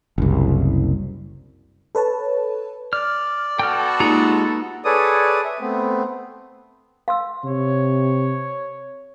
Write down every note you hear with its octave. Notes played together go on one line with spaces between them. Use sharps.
F#1 C2
A4 B4 C#5 A5
D5 F6
B3 F#4 A4 G5 F6
G#3 A#3 D#4 F4 G4
G#4 A4 B4 C#5 D5 D#6
E5
A3 B3 C4
F5 C6 E6
C3 C#5